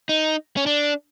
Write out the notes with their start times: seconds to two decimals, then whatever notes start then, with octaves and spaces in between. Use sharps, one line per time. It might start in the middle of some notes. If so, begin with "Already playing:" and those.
0.09 D#4
0.57 C#4
0.66 D4